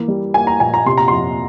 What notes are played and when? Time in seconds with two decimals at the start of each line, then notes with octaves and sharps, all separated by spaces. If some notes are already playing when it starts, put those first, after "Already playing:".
Already playing: E3 A#3
0.08 G3
0.34 A#3 G#5
0.47 A#5
0.60 A#2 G#5
0.74 A#5
0.86 C3 C6
0.98 A#5
1.08 F2 C6